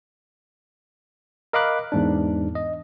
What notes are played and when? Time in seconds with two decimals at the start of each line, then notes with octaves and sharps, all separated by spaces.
1.53 A#4 D#5 F5 B5 D6 F#6
1.92 E2 G#2 D4
2.55 D#5